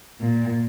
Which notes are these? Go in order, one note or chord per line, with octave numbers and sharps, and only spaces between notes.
A#2